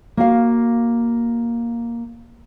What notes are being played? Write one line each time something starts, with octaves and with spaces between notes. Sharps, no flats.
A#3 F#4 F5